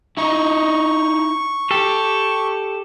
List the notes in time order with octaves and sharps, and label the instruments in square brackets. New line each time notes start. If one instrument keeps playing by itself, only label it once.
[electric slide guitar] D#4 E4 [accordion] C#6
[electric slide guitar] G4 G5 [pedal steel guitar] A4